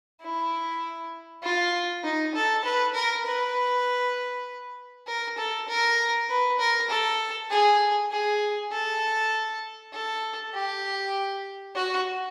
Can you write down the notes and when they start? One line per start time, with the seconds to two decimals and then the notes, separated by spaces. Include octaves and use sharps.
0.21 E4
1.43 F4
2.04 D#4
2.35 A4
2.64 B4
2.94 A#4
3.26 B4
5.07 A#4
5.38 A4
5.68 A#4
6.29 B4
6.59 A#4
6.90 A4
7.50 G#4
8.11 G#4
8.72 A4
9.93 A4
10.54 G4
11.75 F#4